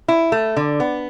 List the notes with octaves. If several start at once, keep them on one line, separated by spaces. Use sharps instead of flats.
E4
A3
D3
B3